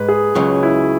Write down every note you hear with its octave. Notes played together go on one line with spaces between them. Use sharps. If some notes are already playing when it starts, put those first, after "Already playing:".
Already playing: G#2 G#3 B4
G#4
C#2 C#3 F#3
E4